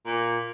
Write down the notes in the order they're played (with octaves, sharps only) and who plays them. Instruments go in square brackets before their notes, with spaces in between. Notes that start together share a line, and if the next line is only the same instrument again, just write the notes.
[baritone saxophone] A#2